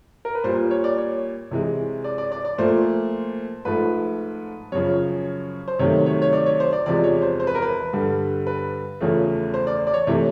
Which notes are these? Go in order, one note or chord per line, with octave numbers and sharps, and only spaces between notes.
A#4
B4
A#2 G3 C5
C#5
D5
C#5
C3 E3 G#3
D5
D5
D5
D5
A#2 F3 A3 C5
G#2 F3 A3 B4
F#2 C#3 F3 C#5
C5
C3 D#3 F#3 A3 C#5
C#5
C#5
D5
C#5
C5
D5
E2 C3 F3 G#3 D5
C#5
C5
C5
B4
A#4
B4
G2 D3 G3
B4
E2 C#3 F3 A3
C5
D5
D5
C#5
C3 E3 A3 C#5